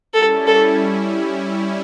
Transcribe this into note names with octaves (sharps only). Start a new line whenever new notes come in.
G3 C#4 E4 A4
A4